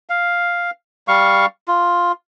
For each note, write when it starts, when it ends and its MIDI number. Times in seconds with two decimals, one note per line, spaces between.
0.09 0.71 77
1.08 1.46 55
1.08 1.46 77
1.08 1.46 85
1.68 2.12 65